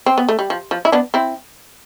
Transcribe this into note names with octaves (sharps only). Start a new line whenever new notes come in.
C4
B3
A3
G3
F3
F3
E4
B3 D4
C4 E4